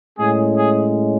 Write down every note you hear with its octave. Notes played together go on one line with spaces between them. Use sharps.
A2 G#3 C#4 G#4
G#4